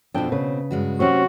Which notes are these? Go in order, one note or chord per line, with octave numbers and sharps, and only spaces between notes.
F2 B2 C4 D4 G5
C#3 B4
G2 G#3 F#4
C3 F#3 A#3 C#4 F#4 G4 C5